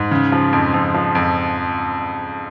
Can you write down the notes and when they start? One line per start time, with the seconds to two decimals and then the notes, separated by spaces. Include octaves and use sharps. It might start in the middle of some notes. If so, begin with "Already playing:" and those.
Already playing: G#2
0.11 C#3
0.32 F3
0.53 F2
0.74 F2
0.94 F3
1.15 F2